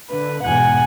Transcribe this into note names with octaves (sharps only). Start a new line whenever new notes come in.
D3 B4
E2 G#2 B2 F#5 G#5